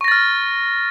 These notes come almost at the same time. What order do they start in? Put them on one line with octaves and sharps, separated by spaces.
C#6 A#6 A6 F6